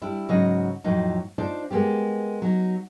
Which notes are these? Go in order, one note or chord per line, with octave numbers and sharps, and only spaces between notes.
G3 D4 E4
G#2 C#3 F#3 D#4 D#5
F2 A2 F#3 D#4
D4 D#4 F4 C5 D5
G#3 A#3 B3 G4
F#3 D#4